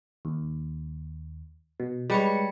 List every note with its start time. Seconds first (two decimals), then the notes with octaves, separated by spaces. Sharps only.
0.25 D#2
1.80 B2
2.10 G3 G#3 B4 C#5 C#7